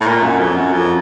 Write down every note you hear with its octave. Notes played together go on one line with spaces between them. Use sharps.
A2
A#2
F#2
F2
F#2
F2